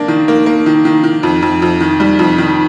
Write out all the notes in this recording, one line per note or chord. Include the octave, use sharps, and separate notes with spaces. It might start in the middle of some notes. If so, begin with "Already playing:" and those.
Already playing: A#3 D4
D#3
A#3
A#3
D#3
D#3
D#3
F2
F2
F2
D#3
G3
F2
D#3